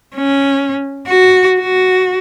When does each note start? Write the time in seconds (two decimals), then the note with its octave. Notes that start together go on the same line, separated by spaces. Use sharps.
0.15 C#4
1.07 F#4
1.60 F#4